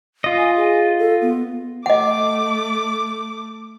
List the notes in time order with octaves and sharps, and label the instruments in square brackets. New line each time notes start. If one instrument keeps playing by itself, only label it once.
[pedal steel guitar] F4 D#5
[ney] G#5
G#4
A4
B3
[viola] A3 D6 [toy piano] D#5 F#5